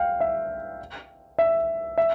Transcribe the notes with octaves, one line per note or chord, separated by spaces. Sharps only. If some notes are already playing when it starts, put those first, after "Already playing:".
Already playing: F5 G5
E5
E5
E5